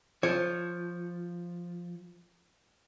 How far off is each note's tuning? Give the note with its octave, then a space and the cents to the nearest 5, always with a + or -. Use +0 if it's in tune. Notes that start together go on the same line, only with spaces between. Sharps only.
F3 +0 C#5 +0